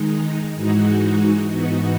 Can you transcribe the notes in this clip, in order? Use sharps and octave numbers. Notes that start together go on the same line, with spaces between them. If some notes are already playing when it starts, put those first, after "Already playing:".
Already playing: D#3 G#3 D#4
G#2 E3 G#3 D#4 F#4
G#2 E3 B3 D#4 F#4